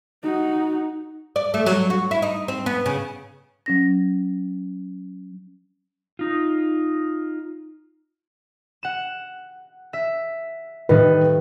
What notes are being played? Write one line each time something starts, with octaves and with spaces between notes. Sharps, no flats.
D#4 F#4
D5
A3
F#3
F#4
E4
D#4
C4
B3
C#3
F#3 C#4 A#6
D#4 F4
F#5 E7
E5
A2 D#3 G3 D#4 B4